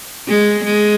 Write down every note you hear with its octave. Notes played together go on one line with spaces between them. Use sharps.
G#3
G#3